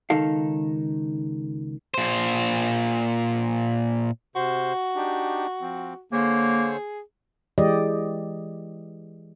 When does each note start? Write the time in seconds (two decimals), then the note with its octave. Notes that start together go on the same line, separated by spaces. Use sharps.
0.10 C#2 D#3 D#4 A4 F5
1.94 A#2 C5
4.36 C3 F#4 C5 C6
4.96 D4 D#4 G4
5.62 F3 C4
6.12 D3 A#3 G#4 C5 C#5
7.58 E3 G#3 G4 D5 D#5